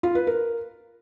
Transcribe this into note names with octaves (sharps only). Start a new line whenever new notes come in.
F4
B4
A#4